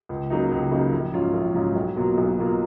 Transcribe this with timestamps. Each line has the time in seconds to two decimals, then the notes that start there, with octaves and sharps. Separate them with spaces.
0.09 C#2
0.30 C#3 F#3 A#3 D#4
0.52 C#2
0.71 C#3 F#3 A#3 D#4
0.92 A#1
1.13 G#2 F#3 C#4 F4
1.33 A#1
1.54 G#2 F#3 C#4 F4
1.75 B1
1.96 B2 F#3 A#3 F4
2.17 B1
2.37 B2 F#3 A#3 F4